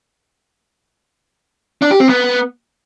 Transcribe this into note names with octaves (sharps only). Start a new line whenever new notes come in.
D4
G4
C4
B3